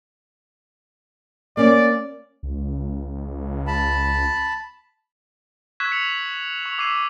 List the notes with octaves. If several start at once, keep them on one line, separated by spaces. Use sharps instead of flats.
A#3 C#4 D5
C#2
A5 B5
C#6 E6 F#6 G#6 B6 E7
C#7 F7 F#7
C#6 F7
D6 E6 G#6 B6 C7 D#7